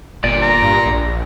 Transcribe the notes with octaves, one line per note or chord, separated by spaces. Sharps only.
G1 A#2 D5
A#5
G2
A#1